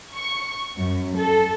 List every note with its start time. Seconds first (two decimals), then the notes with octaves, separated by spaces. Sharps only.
0.15 C#6
0.77 F#2
1.17 A4